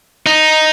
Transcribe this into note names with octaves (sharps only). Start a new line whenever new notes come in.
D#4